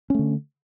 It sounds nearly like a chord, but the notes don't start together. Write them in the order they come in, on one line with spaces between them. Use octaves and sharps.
C#4 A3 D3